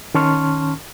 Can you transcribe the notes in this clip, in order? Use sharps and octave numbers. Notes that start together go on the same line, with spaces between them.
D#3 C#4 A5 C6 C#6 F6